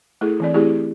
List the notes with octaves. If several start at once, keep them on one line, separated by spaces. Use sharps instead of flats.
A3 E4 G#4 A4
E3 C4 D5
A3 C4 E4 G4 G#4